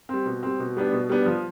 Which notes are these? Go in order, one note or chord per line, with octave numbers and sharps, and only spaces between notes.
G3 C4
B2
G3 C4
B2
G3 B3 D4
B2
G3 B3 D4
F3